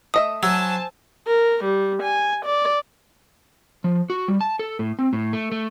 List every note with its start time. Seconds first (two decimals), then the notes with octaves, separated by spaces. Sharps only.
0.14 A3 D#5 E5 D#6
0.43 F#3 C5 G#5 A5 E6
1.27 A#4
1.64 G3
2.03 G#5
2.46 D5
3.84 F3
4.10 F#4
4.28 G3
4.41 A5
4.59 A4
4.79 A2
4.99 C4
5.13 A2
5.33 A3
5.52 A3